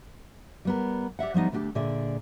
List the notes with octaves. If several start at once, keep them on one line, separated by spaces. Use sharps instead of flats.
G3 B3 A#4
G4 D5 E5 F#5
F3 G3 B3 D#4
D2 A3 D4 F#4 G4 A4
A#2 D3 G#4 D5 E5